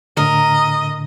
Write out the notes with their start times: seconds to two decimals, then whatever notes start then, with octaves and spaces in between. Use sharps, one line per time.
0.17 A2 D3 A#4 D#5